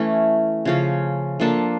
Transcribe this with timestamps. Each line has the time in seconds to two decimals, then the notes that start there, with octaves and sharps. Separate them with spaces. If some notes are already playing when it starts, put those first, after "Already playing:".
Already playing: E3 A3 C#4
0.65 C#3 F3 C#4
1.40 F3 A#3 D4 A4